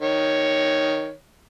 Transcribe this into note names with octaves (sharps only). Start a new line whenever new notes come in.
D#3 C#5